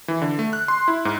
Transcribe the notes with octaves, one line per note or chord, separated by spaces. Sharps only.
E3
D3
A3
F#6
C6
E4
G#2